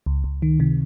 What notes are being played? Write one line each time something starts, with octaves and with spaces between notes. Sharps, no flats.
C#2
C#2
D#3
C3